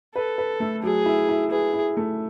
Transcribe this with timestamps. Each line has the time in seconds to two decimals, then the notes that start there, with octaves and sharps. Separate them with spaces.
0.15 A4 B4
0.38 B4
0.60 A3
0.83 F#3 G#4
1.06 E4
1.29 E4
1.51 G#4 B4
1.73 E4
1.97 A3